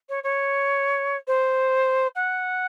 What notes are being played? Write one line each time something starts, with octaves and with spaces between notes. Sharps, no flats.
C#5
C#5
C5
F#5